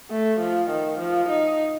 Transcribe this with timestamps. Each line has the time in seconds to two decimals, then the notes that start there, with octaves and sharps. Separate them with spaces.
0.11 A3
0.40 F3
0.70 D#3
0.99 F3
1.29 D#4